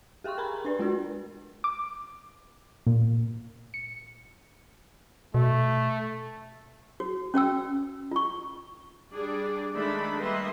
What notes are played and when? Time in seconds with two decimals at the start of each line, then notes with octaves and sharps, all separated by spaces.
0.24 G4 G#4 G5 C6 C#6
0.38 A#4 G#5 A#5 B5
0.53 A#5
0.65 D4 B4 D5
0.79 G#3 D4 F#4 A#4
1.64 D6
2.87 A#2
3.74 C#7
5.35 B2 A3
7.00 F#4
7.34 C#4 F#4 G5 E6
8.11 F4 C#6
9.13 G3 D4 G#4 D5
9.73 D#3 G#3 A3 D4 A4 B5
10.17 G3 A#3 B4 D#5 E5 C6